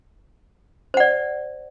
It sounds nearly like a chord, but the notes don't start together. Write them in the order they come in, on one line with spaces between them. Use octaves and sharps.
C5 F#5 D5